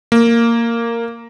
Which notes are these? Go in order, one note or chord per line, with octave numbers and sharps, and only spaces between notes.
A#3